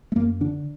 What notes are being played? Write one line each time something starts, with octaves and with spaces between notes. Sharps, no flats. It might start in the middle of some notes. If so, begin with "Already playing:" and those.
A3
F#2 A#3
D3 D4